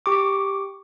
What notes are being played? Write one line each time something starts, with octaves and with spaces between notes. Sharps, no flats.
G4 C#6 D6